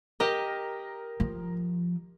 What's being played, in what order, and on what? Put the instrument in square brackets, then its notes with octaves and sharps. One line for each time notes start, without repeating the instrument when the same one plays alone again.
[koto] G4 D#5 [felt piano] A#4
[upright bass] F3